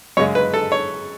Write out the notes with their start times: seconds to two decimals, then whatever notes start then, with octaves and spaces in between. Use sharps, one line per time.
0.17 F#2 C#3 G#3 C#5
0.35 B4
0.54 A4
0.72 C#5